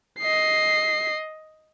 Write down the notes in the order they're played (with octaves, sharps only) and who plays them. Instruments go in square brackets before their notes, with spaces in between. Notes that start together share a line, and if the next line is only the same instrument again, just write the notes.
[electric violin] D#5 C7